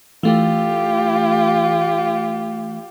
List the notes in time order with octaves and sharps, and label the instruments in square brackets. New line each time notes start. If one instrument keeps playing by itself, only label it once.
[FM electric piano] E3 A3 [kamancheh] F4 G4